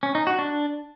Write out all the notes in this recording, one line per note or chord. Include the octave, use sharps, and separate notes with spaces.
C#4
D#4
F#4
D4